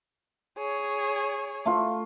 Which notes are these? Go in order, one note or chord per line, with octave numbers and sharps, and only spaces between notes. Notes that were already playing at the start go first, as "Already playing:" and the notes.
G#4 C#5
A3 F4